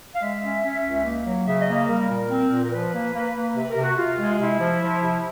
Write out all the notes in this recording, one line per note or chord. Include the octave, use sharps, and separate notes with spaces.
F5
G#3 E5
C#4
C#4
C#2
A#3
F#3
C#3 E5
D#5
A#3
D#5
G3 A#4
A#2
C4
A#2
A#4
F3 B4
A#3
A#3
A#3
C3 B4
A#4
C3
F#4
C3 F4
G#3
C3 E4
F3
F3
C3